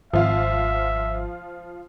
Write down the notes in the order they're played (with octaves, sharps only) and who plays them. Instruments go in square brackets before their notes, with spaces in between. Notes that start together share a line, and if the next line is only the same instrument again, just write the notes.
[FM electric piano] G#1 [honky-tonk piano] F3 F4 F5 [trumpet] E5